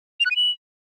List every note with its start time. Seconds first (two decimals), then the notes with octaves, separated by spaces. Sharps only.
0.20 F7
0.25 F#6
0.31 D#7
0.36 F#7